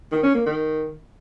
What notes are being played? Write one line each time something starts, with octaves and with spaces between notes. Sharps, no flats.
D#3
C#4
A#3
D#3